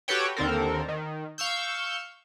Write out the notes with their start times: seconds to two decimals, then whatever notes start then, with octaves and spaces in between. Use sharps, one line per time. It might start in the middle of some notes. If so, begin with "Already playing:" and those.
0.08 F#4 G4 A4 B4 C#5 G5
0.36 D#2 D3 C4 A4 A#4
0.88 D#3
1.38 F5 C#6 E6 G6